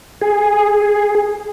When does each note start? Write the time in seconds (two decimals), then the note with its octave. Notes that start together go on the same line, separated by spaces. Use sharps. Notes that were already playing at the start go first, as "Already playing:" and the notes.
0.21 G#4